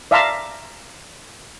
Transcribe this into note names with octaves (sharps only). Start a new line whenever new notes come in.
D5 E5 F5 A5 A#5 C6